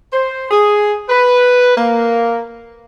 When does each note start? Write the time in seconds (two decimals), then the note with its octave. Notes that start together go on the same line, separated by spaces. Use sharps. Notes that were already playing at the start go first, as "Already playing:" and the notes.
0.13 C5
0.51 G#4
1.09 B4
1.77 A#3